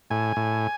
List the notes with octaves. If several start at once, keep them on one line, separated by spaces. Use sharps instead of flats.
A2 G#5
A2